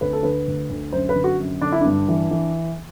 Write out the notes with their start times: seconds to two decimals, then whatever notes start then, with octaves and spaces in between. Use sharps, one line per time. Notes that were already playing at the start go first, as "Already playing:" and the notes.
0.01 D2 B4
0.13 A4
0.23 D3 B4
0.48 D2
0.70 D2
0.93 F#2 C5
1.09 B4
1.16 D3
1.24 F#4
1.40 F#2
1.62 D3 D4
1.72 E4
1.81 G2 D4
2.08 E3
2.31 E3